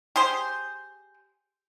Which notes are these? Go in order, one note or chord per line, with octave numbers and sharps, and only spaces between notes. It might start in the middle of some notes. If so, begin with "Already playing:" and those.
G4 G#4 C5